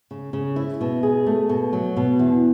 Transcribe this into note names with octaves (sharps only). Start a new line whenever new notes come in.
C#3
C#3
E4
B2
G#4
A3
B2
F#3
B2
E2